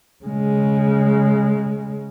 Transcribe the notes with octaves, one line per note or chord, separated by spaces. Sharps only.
C#3 G#3